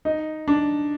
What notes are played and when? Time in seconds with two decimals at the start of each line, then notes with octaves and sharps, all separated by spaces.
0.05 D#4
0.48 D4